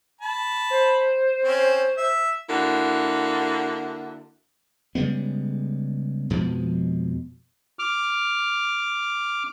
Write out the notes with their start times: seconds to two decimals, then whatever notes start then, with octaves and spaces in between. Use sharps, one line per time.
0.21 A5 B5
0.70 C5
1.44 C4 C#4
1.97 E5
2.49 D3 A#3 E4 F#4
4.95 C#3 G3 G#3 B3
6.30 F2 B2 F3 G#3
7.79 D6 F6